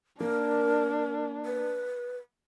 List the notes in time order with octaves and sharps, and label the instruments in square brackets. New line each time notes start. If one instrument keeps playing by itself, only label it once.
[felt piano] A#3 [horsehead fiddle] D4 [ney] A#4
[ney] B4